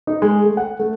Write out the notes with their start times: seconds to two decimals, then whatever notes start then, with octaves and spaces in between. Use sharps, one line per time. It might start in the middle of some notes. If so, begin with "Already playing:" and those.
0.07 D#4
0.22 G#3
0.44 A3
0.57 F#5
0.79 A3